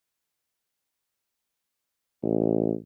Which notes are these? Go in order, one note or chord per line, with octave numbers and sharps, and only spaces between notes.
A1